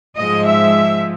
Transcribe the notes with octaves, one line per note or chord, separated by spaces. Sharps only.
G#2 F3 G#3 D#5
E5